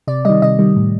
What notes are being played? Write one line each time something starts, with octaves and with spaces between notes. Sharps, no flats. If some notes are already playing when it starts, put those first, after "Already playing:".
C3 D5
D#3 G3 D#5
C3 D#5
D#3 G3
A2